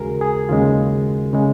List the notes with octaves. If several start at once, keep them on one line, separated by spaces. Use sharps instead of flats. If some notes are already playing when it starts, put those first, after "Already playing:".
Already playing: D#2 C#3 G#3 F#4 G#4 A#4
G#4
D#2 C#3 G#3 F4
C#3 G#3